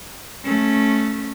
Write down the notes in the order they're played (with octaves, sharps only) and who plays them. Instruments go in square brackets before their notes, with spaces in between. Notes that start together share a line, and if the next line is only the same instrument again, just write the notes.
[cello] A3 C#4